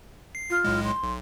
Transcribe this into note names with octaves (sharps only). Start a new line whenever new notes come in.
C7
F4
B1 A2 G#3
C6
B1